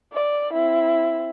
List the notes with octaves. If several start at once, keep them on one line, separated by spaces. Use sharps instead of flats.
D5
C4 E4